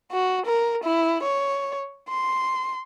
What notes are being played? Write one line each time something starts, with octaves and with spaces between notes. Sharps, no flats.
F#4
A#4
E4
C#5
C6